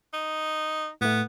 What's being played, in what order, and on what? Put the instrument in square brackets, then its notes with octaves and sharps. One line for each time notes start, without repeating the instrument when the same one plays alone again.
[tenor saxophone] D#4
[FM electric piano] A2 A3 [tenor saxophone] B3